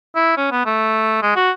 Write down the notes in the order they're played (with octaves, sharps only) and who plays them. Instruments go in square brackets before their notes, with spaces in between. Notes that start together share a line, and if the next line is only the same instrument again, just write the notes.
[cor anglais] E4
C#4
B3
A3
G#3
F#4